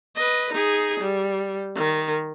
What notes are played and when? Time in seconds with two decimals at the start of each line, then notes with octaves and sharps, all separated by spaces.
0.15 B4 D#5
0.53 D#4 G#4
1.00 G3
1.75 D#3